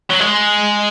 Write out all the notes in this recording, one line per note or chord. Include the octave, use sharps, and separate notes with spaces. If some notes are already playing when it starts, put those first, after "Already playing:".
F#3
G#3